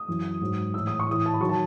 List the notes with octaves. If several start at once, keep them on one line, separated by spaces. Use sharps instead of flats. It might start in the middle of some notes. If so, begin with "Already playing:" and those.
Already playing: D#6
F#2 E3
G#2 F#3
A2 E3 E6
D#6
C#6
A2 E3 D#6
A5
B5
D#3 F#3 C#6
A5